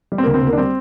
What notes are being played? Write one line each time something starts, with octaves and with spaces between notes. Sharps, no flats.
G3
C4
D2 A#3
C4
D2 A#3
D4
G3 C4